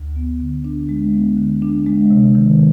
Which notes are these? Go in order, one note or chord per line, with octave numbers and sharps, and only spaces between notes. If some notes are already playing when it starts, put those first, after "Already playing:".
Already playing: D2
B3
D3
D4
G#3
B3
D3
D4
G#3
C3
D#3